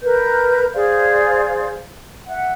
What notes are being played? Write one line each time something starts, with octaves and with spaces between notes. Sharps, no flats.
A#4 B4 G6
G#4 C5 D5 F5
E5 F#5